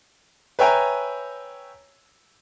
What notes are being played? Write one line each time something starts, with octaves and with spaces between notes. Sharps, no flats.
B4 C#5 E5 G5 G#5 A#5